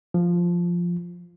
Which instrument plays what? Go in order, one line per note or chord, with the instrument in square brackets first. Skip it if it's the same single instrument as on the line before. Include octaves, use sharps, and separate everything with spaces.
[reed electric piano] F3